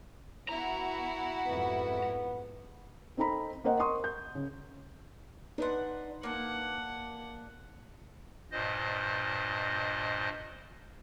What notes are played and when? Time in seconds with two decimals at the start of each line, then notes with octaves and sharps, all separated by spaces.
0.49 B3 E4 F#4 A#5
1.47 F2 G#2 B3
3.17 C4 D#4 A4 A#5 B5
3.64 A#3 C4 A#4 C5 D#5 F#5
3.79 A#4 C6 C#6 D#6
4.04 G6
4.35 C#3
5.58 D4 D#4 B4 F#5 C6
6.23 A#3 D4 F#5
8.52 G2 A#2 C5 D#5